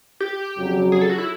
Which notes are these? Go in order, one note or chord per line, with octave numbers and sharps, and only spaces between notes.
G4
F2 C#3 F#3
G#4
A4
F#4
E4